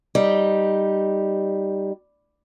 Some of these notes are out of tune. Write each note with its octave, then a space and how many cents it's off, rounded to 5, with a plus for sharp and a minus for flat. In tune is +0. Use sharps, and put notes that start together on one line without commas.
G3 +0 D#4 +0